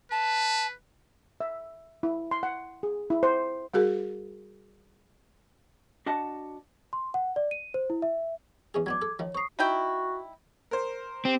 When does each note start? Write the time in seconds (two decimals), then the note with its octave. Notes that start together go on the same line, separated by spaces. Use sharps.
0.12 B4 A5
1.41 E5
2.03 E4
2.31 C6
2.43 F#5
2.83 G#4
3.10 E4
3.23 C5
3.74 G3 F#4 G#4 A#4
6.06 D4 F#4 D#5 F#5 A5
6.93 C6
7.14 F#5
7.36 D5
7.51 D#7
7.74 C5
7.90 E4
8.02 E5
8.74 E2 C#4 G#4
8.86 F#3 B3 D4 D6 G#6
9.02 A4
9.19 D#3 F3 C#5
9.35 C5 A#5 C#6 D#6 C7
9.59 D#4 E4 F#4 G5
10.71 A#4 C5
11.25 C4 G4